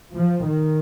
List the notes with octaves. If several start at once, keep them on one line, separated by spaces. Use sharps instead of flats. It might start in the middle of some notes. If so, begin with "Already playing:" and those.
F3
D#3